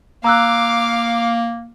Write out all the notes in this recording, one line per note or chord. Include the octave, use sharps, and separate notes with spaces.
A#3 F5 A#5 D6 E6 F#6